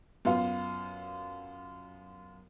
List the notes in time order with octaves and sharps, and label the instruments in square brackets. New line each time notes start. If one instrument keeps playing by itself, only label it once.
[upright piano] F#2 B3 F4 F5